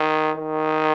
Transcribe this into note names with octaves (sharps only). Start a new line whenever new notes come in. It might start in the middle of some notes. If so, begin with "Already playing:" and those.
Already playing: D#3
D#3